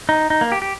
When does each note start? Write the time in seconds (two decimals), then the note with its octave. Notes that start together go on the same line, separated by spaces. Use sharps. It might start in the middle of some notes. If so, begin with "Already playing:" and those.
0.09 D#4
0.30 D#4
0.41 A#3
0.52 G4
0.62 G4